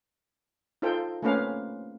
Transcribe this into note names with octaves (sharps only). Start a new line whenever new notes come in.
D#4 F4 A4 C5 G5
A3 A#3 C4 C#4 B4 F5